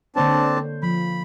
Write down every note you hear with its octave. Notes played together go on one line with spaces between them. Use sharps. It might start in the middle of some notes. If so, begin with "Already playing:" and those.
D3 A#3 C4 D4 C#5 A5
C5
F3 B5